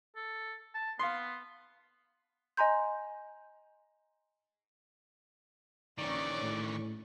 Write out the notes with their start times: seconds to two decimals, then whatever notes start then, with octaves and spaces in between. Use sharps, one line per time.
0.16 A4
0.75 A5
0.99 B3 F5 C6
2.57 D#5 G#5 A#5 C6 G6
5.98 A#1 D#3 E3 C#4 D5 C#6
6.41 A2